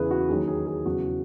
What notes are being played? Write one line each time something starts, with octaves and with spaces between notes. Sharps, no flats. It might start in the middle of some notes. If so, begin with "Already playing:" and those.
Already playing: E2 C#3 E3 G#4 B4
F#4
D#2 D#3 F#3 G#4
G#4
G#4
E2 C#3 F#3 F#4